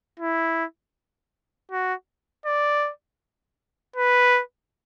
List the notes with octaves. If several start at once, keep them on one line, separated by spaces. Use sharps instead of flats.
E4
F#4
D5
B4